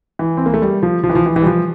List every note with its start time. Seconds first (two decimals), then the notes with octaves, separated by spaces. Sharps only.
0.19 E3
0.37 C4
0.46 A#3
0.54 A3
0.62 G3
0.83 F3
1.04 F3
1.09 E3
1.15 F3
1.26 E3
1.36 E3
1.42 G3
1.46 F3